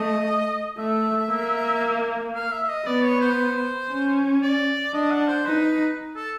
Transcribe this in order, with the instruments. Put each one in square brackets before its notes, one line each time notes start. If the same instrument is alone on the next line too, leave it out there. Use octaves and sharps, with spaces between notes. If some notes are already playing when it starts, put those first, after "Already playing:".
Already playing: [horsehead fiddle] A3 [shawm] D#5
[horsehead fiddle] A3 [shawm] E5
[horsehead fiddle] A#3
[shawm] F5
E5
E5
D#5
[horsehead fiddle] B3 [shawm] D5
[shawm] C#5
C5
[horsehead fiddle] C#4
[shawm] D5
[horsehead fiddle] D4 [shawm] D#5
[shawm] F#5
C5
[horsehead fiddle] D#4 [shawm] B4
[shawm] A4